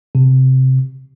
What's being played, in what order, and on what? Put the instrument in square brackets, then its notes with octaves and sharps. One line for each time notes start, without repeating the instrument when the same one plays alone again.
[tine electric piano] C3